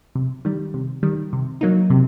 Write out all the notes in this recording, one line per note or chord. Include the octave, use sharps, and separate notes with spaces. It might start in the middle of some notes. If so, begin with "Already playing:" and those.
C3
D#3 G3
C3
D#3 G3
C3
F#3 A#3 D#4
C3